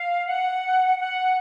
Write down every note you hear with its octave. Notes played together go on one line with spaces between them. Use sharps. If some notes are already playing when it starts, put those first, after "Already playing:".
Already playing: F5
F#5
F#5